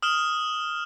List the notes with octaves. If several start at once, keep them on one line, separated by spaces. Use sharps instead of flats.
D#6 F6 E7 G7